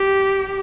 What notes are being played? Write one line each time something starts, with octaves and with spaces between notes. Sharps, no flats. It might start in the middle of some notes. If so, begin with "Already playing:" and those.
Already playing: G4